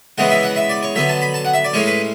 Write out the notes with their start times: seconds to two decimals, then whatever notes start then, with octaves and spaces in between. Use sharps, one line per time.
0.18 C#3 E3 G#3 B3 F#5
0.30 E5
0.43 F#5
0.56 E5
0.69 D5
0.83 C#5
0.95 D3 F#3 B3 E5
1.09 A5
1.22 B5
1.34 A5
1.45 F#5
1.54 E5
1.64 D5
1.73 A2 G#3 C#4 C#5
1.86 B4